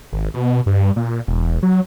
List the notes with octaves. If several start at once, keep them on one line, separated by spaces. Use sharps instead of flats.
G#1
B2
G2
A#2
E1
F#3